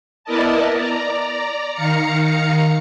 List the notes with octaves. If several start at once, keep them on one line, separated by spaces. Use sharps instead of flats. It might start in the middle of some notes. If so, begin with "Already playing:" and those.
B3 E4 A#4 D5 D#5 A5
D5 A#5
D#3 F5 A#5 C#7